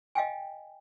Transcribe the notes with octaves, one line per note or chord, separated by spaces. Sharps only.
D#5 F5 G5 G#5